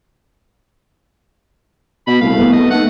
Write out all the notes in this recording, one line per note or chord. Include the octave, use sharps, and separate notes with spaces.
B2 B5
C2 A3 F5
B3
D#5
D#2 F#5